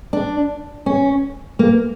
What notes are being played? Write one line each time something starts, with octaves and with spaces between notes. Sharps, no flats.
D4
C#4
A#3